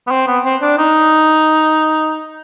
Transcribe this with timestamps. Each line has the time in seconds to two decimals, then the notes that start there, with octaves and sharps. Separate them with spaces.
0.07 B3
0.11 C4
0.27 B3
0.45 C4
0.62 D4
0.78 D#4